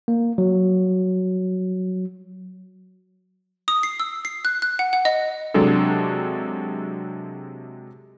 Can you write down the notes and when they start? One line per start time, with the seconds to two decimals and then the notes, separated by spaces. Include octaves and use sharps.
0.08 A#3
0.38 F#3
3.68 D#6
3.83 C7
4.00 E6
4.25 C7
4.45 F#6
4.62 F#6
4.79 F#5
4.93 F#5
5.05 D#5
5.54 C3 F#3 G#3 D4 A4